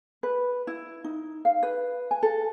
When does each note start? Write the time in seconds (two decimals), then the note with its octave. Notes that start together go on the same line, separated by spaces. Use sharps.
0.23 B4
0.67 E4
1.04 D#4
1.45 F5
1.63 B4
2.11 G#5
2.23 A4